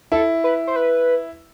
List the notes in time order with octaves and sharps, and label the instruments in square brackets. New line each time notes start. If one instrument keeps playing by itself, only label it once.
[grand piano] E4 [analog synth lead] A4
[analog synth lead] B4
C5
B4